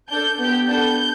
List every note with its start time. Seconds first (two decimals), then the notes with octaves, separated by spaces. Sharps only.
0.11 D4 A4 G6
0.40 B3 G4 G6
0.67 B3 D4 A4 G6